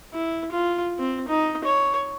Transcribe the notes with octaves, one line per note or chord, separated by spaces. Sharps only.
E4
F4
C4
D#4
C#5